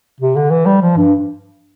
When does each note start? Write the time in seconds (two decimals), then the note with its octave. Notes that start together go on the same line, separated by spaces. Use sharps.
0.20 C3
0.36 D3
0.51 E3
0.66 G3
0.82 F3
0.97 G2